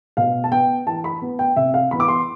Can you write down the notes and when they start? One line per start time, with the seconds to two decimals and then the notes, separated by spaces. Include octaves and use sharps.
0.17 B2 F5
0.44 A5
0.51 B3 G5
0.87 E3 A5
1.04 B5
1.22 B3
1.39 G5
1.56 C3 E5
1.74 F5
1.91 E3 B3 B5
2.00 D6
2.08 C6